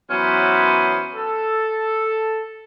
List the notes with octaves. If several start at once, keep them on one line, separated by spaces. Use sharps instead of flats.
E3 F#3 B3 C#4 B4 C5
A4